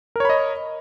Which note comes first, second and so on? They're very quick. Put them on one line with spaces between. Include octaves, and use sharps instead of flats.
A#4 C#5 B5 D#5